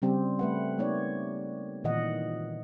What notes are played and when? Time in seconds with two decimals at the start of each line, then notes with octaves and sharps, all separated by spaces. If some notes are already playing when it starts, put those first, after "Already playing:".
0.02 C#3 G3 C4 G4
0.39 A3 B4 F#5
0.79 A#3 B3 D#4 C#5 D5
1.84 A#2 D#3 E3 D#5 F#5